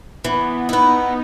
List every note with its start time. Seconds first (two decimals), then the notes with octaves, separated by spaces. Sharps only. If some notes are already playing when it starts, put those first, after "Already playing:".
0.24 E3 B3
0.69 B3 D#4 E4